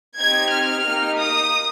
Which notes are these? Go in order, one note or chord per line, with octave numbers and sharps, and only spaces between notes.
C4 D#4 G4 G#6
F6
A#3 D#4 G4
D#6